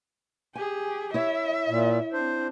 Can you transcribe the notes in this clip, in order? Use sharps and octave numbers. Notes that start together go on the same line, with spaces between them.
G4 G#4 G#5
E4 C#5 E5
A#2
C4 D4 C5